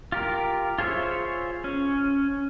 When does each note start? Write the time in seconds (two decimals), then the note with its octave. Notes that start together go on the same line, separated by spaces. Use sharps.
0.12 F4 G4 A#4
0.79 F4 G#4 C5 C#5 E5
1.64 C#4